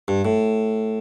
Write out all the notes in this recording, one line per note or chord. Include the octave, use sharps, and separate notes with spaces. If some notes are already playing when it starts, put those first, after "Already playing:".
G2
A2